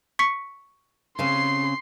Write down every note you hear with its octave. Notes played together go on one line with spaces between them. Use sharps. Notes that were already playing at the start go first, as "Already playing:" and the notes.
C#6 B6 C#7
C#3 C4 C#4 C6 C7